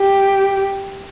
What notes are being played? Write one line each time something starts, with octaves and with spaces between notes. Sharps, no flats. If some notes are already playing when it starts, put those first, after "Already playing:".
Already playing: G4